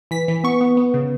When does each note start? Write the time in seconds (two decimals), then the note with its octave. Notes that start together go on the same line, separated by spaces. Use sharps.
0.11 E3 B6
0.28 E3
0.44 B3 C#6
0.61 B3
0.77 B3
0.94 C#3